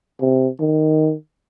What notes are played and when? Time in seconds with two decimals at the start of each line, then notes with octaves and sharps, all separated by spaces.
0.21 C3
0.60 D#3